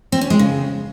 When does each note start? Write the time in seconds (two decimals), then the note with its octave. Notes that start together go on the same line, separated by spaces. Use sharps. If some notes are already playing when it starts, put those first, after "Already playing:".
0.12 C4
0.21 C#4
0.30 G#3
0.39 C#3